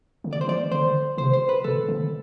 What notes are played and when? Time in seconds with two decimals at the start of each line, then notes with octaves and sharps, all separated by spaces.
0.24 D3
0.33 D5
0.41 C5
0.48 E3 D5
0.71 D3 C5
1.18 C3 C5
1.33 C5
1.49 B4
1.64 B2 A4
1.88 D3